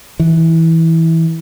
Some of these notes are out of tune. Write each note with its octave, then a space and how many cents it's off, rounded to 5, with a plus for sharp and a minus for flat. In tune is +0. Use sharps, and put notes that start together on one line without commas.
E3 -15